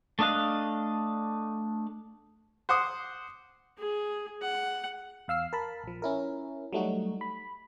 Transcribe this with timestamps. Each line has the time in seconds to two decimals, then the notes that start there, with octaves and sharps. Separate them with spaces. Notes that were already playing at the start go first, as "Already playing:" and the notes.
0.19 A3 D4 D#5 F5 F#6
2.69 C5 F#5 D6 D#6
3.78 G#4
4.42 F#5
5.28 E2 F5 E6 C7
5.53 A#4 A5 B5
5.83 A#1 F3
6.02 C#4 E4 A#4
6.73 F#3 G3 A3 D#4 F#4
7.21 B5